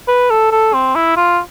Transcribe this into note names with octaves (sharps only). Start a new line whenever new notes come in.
B4
A4
A4
C4
E4
F4